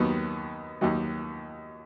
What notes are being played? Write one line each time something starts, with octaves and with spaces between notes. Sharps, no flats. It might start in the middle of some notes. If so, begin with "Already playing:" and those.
Already playing: D#2 D#3 F#3 B3
D#2 D#3 F#3